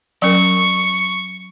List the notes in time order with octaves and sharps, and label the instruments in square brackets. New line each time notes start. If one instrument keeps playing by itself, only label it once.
[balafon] F#3 C#4 A#4 [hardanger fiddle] C#6